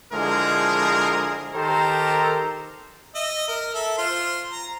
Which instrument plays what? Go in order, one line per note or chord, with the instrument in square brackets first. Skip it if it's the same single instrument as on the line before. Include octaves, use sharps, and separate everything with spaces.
[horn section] D3 F3 G#3 E4 G#4 A#4
D#3 G4 A4 A#4 C5 A#5
[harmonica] D#5 E5
A#4
A4 E5
F4 C5 C6
A#5